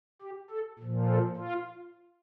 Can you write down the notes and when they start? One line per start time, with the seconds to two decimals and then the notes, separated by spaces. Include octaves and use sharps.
0.22 G4
0.51 A4
0.79 A#2 F3
1.08 A4
1.37 F4